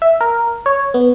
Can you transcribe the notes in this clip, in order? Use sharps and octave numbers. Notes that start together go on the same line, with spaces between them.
E5
A#4
C#5
B3